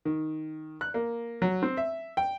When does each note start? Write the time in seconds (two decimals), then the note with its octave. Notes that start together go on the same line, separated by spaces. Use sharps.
0.05 D#3
0.81 F#6
0.94 A#3
1.42 F#3
1.63 C4
1.77 E5
2.17 G5